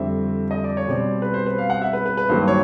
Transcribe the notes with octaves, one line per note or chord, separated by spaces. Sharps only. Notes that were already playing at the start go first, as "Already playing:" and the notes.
Already playing: F2 D3 G3 C4 E5
D#5
D5
C#5
B2 G3 C4 D5
B4
C5
B4
F5
F#5
E5
B4
B4
B4
G2 D#3 F#3 A#3 C5
C#5